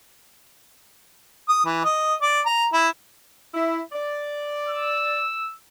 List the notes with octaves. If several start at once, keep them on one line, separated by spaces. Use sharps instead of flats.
D#6
E3
D#5
D5
A#5
E4
E4
D5
E6